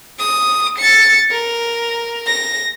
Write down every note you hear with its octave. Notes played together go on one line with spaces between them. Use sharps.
D#6
A6 C#7
A#4
A#6